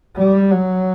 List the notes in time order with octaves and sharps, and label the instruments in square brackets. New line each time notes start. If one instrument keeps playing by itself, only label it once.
[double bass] G3
F#3